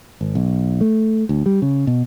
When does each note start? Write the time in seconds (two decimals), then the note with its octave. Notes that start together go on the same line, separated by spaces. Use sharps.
0.21 G#1
0.35 B1
0.81 A3
1.29 D2
1.46 G3
1.62 C#3
1.87 B2